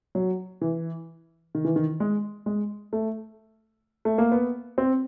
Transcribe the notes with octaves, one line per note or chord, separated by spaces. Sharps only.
F#3
E3
D#3
E3
D#3
G#3
G#3
A3
A3
A#3
B3
C4